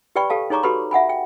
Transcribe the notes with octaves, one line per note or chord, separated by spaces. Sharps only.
G4 B4 D5 G5 B5 C#6
G4 A4 F5 A5
D#4 G#4 C#5 A#5 C#6 D6
F#4 G4 A4 B4 B5 C6
E5 F#5 G#5 B5
G5